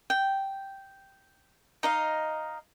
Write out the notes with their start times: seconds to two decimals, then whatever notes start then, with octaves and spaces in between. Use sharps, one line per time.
0.10 G5
1.83 D#4 D#5 F5